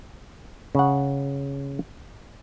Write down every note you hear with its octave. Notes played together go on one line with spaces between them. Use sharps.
C#3 F#5